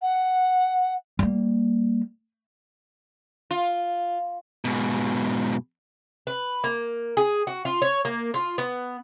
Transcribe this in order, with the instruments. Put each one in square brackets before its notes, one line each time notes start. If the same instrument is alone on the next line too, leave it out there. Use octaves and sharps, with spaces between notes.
[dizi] F#5
[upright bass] G3 A#3
[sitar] F4
[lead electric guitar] G#2 B2
[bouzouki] B4
A#3
G#4
F#4
F4
C#5
A#3
F4
B3